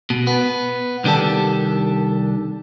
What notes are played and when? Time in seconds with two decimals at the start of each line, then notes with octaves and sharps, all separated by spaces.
0.10 B2
0.27 B3
1.04 C2 D#3 D4 G4 A4